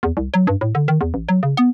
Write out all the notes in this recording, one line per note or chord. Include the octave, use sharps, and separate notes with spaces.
E2
C2
F#3
G2
A2
D3
D#3
E2
A1
F#3
C#3
B3